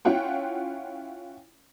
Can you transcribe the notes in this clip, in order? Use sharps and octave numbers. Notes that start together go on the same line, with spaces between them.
C#4 E4 F4 F#5 G5